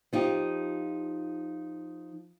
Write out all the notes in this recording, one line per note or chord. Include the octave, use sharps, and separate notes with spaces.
F3 D#4 F4 G4